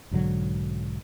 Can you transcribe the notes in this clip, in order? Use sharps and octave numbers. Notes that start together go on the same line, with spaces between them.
B1 G#2 D3 F#3